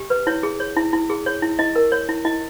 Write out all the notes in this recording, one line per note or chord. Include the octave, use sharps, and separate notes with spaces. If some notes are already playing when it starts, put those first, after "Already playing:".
Already playing: G4
B4
E4 C#5
G#4
C#5
E4
E4
G#4
C#5
E4
E4 D#5
A#4
C#5
E4
E4 D#5